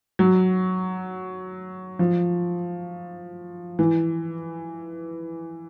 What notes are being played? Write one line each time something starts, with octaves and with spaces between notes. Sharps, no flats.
F#3
F3
E3